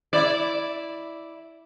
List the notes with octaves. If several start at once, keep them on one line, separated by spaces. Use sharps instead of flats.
E4 D5